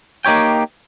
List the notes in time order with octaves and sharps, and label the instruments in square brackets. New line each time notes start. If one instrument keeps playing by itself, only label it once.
[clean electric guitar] A#3 D#4 G4 C#5 G5